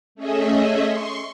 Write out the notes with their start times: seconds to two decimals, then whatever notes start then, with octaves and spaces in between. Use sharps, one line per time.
0.15 A3 C#4 G#4 D#5 E5
0.84 C6 C#6